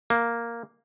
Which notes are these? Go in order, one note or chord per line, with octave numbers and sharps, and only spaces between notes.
A#3